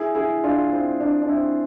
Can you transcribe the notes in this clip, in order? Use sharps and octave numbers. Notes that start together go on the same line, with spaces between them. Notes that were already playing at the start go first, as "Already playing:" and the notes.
Already playing: E4 G#4
E4 G#4
D4 F4
C4 E4
D4
D4
C4 E4